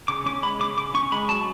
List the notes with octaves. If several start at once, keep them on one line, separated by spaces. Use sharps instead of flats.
C#3 D6
C#4 D6
G#3 B5
C#3 D6
C#3 D6
C#4 C#6
G#3 B5
F#3 A5